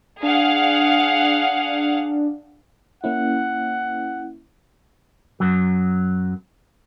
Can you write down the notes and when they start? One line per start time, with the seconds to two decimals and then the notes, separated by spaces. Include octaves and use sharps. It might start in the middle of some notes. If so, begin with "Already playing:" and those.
0.23 D4 G#4 F5 F#5
3.04 A#3 C#4 E4 F#5
5.40 F#2 F#3